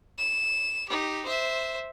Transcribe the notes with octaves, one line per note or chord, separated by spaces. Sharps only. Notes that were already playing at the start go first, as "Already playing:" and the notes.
E7
D#4 G4
C5 E5